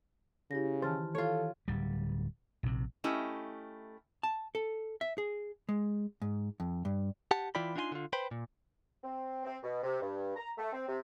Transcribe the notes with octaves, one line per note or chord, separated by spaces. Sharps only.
C#3 E4 G4 A#6
D#3 E3 C5 A5 F6 A6
F4 A4 C#5
D1 G3
A#1 C3
A3 C#4 E4 G4 D#5
A5
A4
E5
G#4
G#3
G#2
F2
G2
G4 F#5 A5
E3 E4 F4 D5 G5 B5
D4 D#4 F4 G5 G#5 C6
D3 F4
B4 C5 G5 B5 C6
A#2
C4
C4
B2
C3
G2
A#5
A3
C4
C3